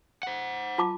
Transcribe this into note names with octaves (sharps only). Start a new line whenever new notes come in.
C5 F#5
F4 A5 D6